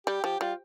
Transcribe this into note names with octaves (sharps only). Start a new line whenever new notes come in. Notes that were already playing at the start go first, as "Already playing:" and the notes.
G3 G4
F3 G4
G3 F4